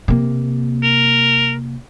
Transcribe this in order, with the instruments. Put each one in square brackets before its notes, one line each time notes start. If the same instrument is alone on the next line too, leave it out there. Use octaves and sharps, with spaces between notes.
[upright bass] C3 A#3
[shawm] A#4